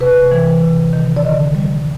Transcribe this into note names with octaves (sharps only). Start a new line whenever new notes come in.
C3 B4
E3
C3
D#3
D5
D3 D#5
G3